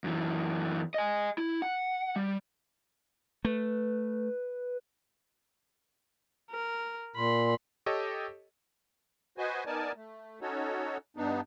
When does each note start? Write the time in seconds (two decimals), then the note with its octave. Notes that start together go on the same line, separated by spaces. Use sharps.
0.04 F#2 E3
0.94 D#5 G#5
1.38 E4
1.62 F#5
2.16 G3
3.45 A3 B4
6.51 A#4
7.16 A#2 B5 C6
7.86 G4 A4 C#5 D#5
9.38 F#4 B4 C5 D#5 G#5
9.66 B3 D#4 A#4 D5 G#5 A5
9.96 A3
10.41 C#4 D#4 F#4 A4 C#5
11.17 G2 B3 D4 D#4